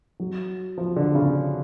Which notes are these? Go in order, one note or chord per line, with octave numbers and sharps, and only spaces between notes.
F#3
F3
D3
C#3